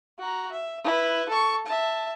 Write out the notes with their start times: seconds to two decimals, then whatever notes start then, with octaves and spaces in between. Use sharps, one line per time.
0.19 F#4 A#5
0.52 E5
0.84 E4 B4
1.29 A4 C#6
1.66 E5 A5